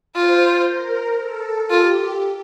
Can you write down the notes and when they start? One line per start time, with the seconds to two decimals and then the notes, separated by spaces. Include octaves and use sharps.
0.14 F4 C5
0.67 A#4
1.18 A4
1.70 F4 G4